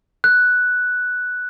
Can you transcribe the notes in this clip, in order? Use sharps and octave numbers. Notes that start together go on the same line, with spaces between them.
F#6